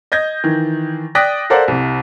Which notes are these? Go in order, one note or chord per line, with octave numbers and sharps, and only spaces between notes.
D#5 G6 G#6 A#6
D#3 E3
D5 G5 D#6 F#6 A#6 B6
A4 A#4 C5 D5 F5 F#5
C2 C3